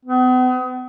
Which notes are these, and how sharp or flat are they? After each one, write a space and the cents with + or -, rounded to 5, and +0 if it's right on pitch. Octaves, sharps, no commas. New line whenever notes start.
B3 +40